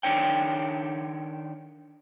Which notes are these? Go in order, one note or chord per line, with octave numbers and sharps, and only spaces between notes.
D#3 D4 C#5 G5